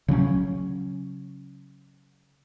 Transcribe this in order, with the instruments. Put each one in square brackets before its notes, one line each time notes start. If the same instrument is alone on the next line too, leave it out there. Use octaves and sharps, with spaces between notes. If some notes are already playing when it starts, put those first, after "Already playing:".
[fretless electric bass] C#3 F#3 C4 C#4